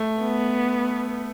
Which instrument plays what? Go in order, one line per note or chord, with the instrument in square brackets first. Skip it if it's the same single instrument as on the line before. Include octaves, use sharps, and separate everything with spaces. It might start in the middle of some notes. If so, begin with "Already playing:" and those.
Already playing: [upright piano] A3
[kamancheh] B3